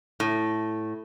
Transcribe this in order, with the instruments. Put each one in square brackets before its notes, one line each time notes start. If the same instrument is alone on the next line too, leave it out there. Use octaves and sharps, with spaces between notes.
[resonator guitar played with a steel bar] A2